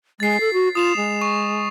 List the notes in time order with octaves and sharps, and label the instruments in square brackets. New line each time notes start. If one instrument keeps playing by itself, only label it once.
[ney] G#3 [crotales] A6 C7
[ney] A4
F#4
[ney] F4 [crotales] D#6 E7 F7
[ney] G#3
[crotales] C#6